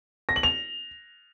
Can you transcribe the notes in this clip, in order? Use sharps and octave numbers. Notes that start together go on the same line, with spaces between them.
A#6
F#7
F7